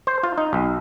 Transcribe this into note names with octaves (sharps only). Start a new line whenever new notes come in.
C5
F4
D#4
B1